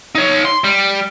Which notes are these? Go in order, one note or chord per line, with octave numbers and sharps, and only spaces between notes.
D#4 C#5
C6
G3